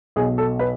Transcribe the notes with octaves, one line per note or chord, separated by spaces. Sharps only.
B1 B2 G#4
A4
B4